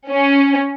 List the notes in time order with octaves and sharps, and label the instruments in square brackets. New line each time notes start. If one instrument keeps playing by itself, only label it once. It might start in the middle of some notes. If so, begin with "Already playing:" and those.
[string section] C#4